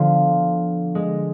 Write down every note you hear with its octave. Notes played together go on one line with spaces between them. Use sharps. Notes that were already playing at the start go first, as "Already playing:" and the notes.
Already playing: D3 F3 B3
G#3